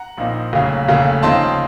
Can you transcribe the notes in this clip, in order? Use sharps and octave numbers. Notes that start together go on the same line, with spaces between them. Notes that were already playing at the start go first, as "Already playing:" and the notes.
Already playing: F#5 A#5
A#1 A#2 F3 C4 D#4
F1 D#2 C#3 F#3
F1 D#2 C#3 A3
D#2 C#3 F3 C4 D#4 A5 C6